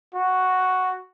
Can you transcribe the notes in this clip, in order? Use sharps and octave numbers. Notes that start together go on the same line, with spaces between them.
F#4